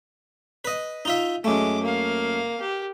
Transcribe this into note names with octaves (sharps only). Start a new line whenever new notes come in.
B4 D#5
D#4 F4 E5
F#2 G#3 A3 D6
A#3 F5
G4